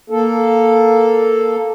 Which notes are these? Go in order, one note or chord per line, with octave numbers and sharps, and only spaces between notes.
A#3 A4